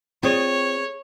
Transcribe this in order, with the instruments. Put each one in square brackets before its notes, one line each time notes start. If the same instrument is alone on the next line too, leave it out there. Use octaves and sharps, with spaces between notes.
[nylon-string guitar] C4 F4 [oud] G#4 D5 [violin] C#5